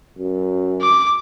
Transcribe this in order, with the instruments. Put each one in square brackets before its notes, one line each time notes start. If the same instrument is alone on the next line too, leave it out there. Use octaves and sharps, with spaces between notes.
[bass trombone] F#2
[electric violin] D6